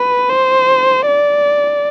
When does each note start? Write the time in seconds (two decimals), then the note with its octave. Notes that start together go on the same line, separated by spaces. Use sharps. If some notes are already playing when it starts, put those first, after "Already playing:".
Already playing: B4
0.30 C5
1.07 D5